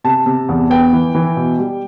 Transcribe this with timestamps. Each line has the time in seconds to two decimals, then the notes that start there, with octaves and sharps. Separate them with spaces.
0.04 C3 A5
0.26 C3
0.49 E2
0.70 B3 G5
0.93 E3
1.15 E3
1.36 B2
1.59 G3